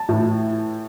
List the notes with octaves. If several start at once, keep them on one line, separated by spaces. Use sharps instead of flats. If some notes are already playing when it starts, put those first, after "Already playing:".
Already playing: A5
A2 E3